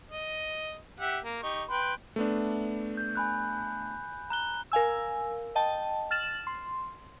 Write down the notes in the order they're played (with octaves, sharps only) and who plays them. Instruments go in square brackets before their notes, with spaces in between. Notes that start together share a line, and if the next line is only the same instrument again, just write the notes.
[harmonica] D#5
G4 E5 F#5
A#3
D#4 G4 C#6
B4 G5 C6
[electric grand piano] A3 B3 D4
[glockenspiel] G6
G#5 B5 F#6
A#5 F#6 G7
[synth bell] A#4 F5 G#5 E6
D#5 G5 A5
F6 A6 E7 F#7
C6